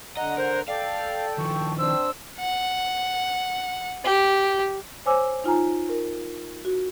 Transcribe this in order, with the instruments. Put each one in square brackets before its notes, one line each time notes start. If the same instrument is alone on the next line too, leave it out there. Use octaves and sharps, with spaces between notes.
[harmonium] D3 F#5 A#5 [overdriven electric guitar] D#5
[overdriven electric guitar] A#4 [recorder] C5
[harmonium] A4 G5 [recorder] D5 [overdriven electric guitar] F5
[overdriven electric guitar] D#3 F3 [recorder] C#6
[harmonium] C4 D4 C5 [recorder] E6
[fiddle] F#5
G4
[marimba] C5 C#5 G#5 D6 E6
D#4 F4 G#5 A#5
A#4
F#4